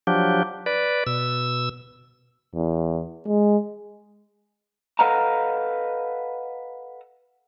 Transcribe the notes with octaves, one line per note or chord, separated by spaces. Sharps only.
F3 F#3 D4 G4
B4 D5
B2 E6
E2
G#3
A4 B4 D#5 F5 F#5 A#5